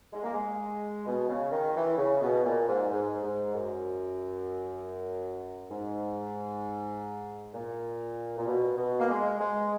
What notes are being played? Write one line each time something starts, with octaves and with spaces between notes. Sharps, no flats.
G#3
A#3
G#3
B2
C#3
D#3
E3
C#3
B2
A#2
G#2
G#2
G#2
F#2
G#2
A#2
A#2
B2
B2
A#3
G#3
G#3